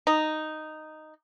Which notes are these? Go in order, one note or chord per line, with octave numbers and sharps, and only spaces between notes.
D#4